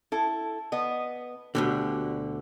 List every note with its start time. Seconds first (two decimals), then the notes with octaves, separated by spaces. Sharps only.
0.12 E4 A4
0.72 B3 D#5
1.55 D2 B2 D3 G4